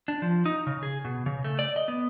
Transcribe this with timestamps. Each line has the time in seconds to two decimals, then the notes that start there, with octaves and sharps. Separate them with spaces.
0.08 D4
0.22 F3
0.46 D#4
0.67 C#3
0.83 G#4
1.05 B2
1.26 C#3
1.44 A3
1.59 D5
1.76 D#5
1.88 B3